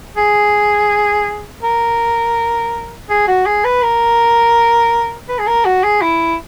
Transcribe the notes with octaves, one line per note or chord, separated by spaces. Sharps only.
G#4
A#4
G#4
F#4
G#4
B4
A#4
B4
G#4
A#4
F#4
G#4
E4